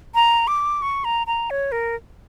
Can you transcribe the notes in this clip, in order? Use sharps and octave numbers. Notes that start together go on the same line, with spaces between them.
A#5
D6
C#6
A#5
A#5
C#5
A#4